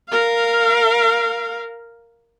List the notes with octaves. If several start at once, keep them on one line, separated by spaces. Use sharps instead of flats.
A#4 F5